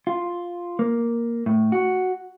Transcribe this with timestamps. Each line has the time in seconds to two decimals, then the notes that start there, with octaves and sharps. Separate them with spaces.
0.07 F4
0.79 A#3
1.46 A2
1.72 F#4